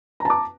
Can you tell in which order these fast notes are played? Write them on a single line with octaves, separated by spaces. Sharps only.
A#5 A5 D6